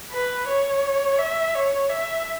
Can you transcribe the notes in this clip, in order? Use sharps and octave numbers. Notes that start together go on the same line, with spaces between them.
B4
C#5
E5
C#5
E5